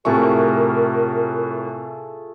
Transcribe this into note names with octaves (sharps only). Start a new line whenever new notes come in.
A2 C3 A3 F4 G#4 A#4 C#6